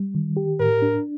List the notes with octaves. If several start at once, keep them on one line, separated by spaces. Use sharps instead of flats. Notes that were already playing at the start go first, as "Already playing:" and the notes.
Already playing: G3
D#3
G4
A2 A#4
D4